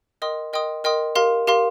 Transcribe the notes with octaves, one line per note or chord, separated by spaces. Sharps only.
A#4 D#5 G5 C6 D#6
A#4 D#5 G5 C6 D#6
A#4 D#5 G5 C6 D#6
G4 A#4 F5 C6
G4 A#4 F5 C6